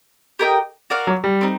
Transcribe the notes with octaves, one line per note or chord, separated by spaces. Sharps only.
G4 A#4 D#5 G5
F#4 A#4 D5 F5
F#3
G3
C4 D#4